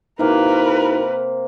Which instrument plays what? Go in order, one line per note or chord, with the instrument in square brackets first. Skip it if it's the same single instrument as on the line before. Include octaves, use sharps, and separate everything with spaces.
[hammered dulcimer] C3 A#3 [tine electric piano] D#4 E4 F#4 [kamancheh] A#4 B4